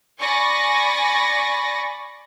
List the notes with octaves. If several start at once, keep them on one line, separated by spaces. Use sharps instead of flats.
D5 G#5 B5 C#6 A6 A#6